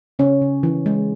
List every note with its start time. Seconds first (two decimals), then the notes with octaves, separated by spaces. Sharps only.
0.19 C#3 C#4
0.42 C#3
0.63 E3
0.86 G#3